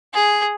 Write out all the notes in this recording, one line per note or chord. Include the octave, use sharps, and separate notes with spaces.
G#4